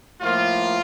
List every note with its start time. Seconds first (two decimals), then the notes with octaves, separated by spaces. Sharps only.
0.20 A2 F3 A#3 F4